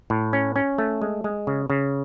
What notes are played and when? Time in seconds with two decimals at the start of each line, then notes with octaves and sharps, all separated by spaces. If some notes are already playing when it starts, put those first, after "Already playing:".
0.10 A2
0.33 C#4
0.56 C#4
0.78 A3
1.02 G#3
1.24 G#3
1.47 C#3
1.70 C#3